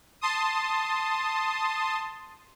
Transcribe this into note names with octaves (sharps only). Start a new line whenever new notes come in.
A5 C6 D#6